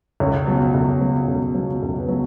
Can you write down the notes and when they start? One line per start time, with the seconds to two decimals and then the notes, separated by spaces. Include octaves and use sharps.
0.20 C#2 C#5
0.47 B2 F#3
0.74 C#2
1.01 B2 F#3
1.28 C#2
1.55 B2 F#3
1.83 C#2
1.99 B4
2.09 B2 F#3